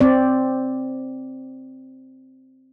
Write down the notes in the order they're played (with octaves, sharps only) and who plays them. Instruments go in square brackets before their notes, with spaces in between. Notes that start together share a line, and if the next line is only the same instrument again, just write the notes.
[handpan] C4 D5